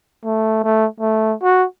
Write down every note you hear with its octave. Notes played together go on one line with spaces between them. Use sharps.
A3
A3
A3
F#4